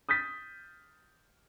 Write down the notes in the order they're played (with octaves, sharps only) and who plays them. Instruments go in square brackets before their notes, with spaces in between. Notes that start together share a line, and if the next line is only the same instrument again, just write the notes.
[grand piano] D#6 G6 A6 B6